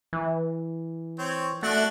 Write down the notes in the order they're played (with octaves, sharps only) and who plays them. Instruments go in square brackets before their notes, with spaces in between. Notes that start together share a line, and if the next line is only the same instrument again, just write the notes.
[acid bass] E3
[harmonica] C4 C#5
[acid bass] A3 [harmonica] D4 F#4 F#5